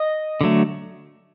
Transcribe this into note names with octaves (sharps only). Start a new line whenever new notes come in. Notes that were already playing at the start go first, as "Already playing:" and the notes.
Already playing: D#5 D#6
D3 F#3 A3